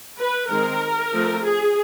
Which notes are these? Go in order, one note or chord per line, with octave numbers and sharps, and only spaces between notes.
B4
D#3 G#3 C4 A#4
F3 A3 C4
G#4